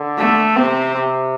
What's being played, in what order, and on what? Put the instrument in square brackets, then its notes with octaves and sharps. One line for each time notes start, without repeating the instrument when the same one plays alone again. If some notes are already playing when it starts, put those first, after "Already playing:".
Already playing: [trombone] D3
[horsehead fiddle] A3
[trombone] C3 [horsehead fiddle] C4
[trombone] C3